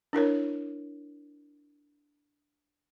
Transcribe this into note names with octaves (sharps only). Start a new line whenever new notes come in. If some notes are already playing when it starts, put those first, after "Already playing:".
D4 E4 A#4 C#5